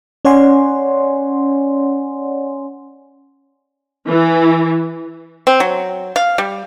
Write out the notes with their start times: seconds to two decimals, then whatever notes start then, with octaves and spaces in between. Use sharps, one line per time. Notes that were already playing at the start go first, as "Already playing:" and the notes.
0.25 C#4 C#5 D5 F#5 G#5 C6
4.07 E3
5.47 C4
5.60 F#3
6.16 F5
6.38 G3